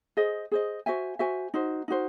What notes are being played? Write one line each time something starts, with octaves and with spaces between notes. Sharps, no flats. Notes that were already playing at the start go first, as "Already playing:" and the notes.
G#4 C5 D#5
G#4 C5 D#5
F#4 C5 E5 G#5
F#4 C5 E5 G#5
D#4 F#4 C5
D#4 F#4 C5